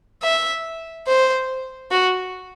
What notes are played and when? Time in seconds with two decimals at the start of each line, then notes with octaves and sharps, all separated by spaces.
0.23 E5
1.07 C5
1.91 F#4